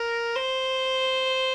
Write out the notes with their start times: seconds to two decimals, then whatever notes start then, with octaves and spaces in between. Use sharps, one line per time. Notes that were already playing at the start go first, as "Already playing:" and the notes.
Already playing: A#4
0.36 C5